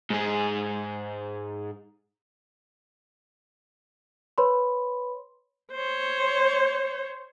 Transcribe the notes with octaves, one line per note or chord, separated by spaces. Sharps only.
G#2 G#4
B4 C#5 B5 C6
C5 C#5